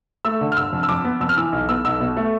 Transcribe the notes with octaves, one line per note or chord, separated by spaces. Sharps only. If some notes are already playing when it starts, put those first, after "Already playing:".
A3 E6
D3
F6
G1 E6
F2
E6
F2 D6
B3
F2 E6
F6
E3 E6
B1
B3 E6
B1 E6
B2
A3